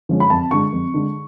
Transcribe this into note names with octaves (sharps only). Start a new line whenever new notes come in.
D3 F3 G#3 C#4
B5
F2 A5
D3 G#3 D4 C#6
F2
D3 G#3 D4